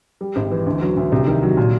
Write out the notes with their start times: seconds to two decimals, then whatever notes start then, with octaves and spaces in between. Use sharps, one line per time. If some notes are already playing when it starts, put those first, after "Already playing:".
0.21 G3
0.36 G#1
0.51 E3
0.66 D2
0.81 F#3
0.97 D2
1.12 C2
1.27 D#3
1.43 F#3
1.57 A#2